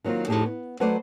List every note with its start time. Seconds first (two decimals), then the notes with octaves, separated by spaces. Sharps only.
0.04 D#3 F#3 A#3 C4 F4
0.28 F2 A2 D#4 G4 G#4 A5
0.46 B3
0.80 F#3 A3 B4 C5 D5